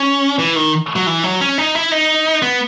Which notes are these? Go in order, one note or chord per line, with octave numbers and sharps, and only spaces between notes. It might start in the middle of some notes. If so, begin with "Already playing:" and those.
Already playing: C#4
E3
D#3
F#3
E3
F#3
C#4
D#4
E4
D#4
B3